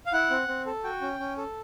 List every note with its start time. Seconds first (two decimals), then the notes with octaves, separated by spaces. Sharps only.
0.06 F5
0.13 E4 F#5
0.30 C4
0.48 C4
0.66 A4
0.84 F#4 G5
1.01 C#4
1.19 C#4
1.37 A4